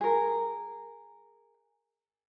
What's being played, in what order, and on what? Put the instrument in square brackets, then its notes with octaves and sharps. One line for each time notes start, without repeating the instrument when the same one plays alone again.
[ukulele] G#4 A#4